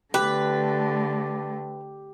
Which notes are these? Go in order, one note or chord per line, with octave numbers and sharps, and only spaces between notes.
D3 A3 G4 B4